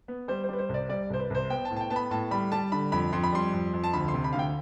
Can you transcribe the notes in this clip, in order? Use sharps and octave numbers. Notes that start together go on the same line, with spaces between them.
B3
G3 C5
C5
G3 B4
C5
C2
D5
G3 D5
C2 C5
B4
C2 C5
B3 G5
A5
A2
A5
G5
B3 A5
B5
A2 A5
G3 B5
G3 A5
D3 B5
F2 B5
F2 C6
B5
G3 C6
F2
F2
A5
D2 B5
C6
C3
B5
D2 F5
G5